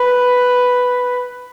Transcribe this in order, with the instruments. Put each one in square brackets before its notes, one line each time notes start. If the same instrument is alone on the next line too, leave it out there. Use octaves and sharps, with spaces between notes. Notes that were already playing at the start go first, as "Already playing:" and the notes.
Already playing: [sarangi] B4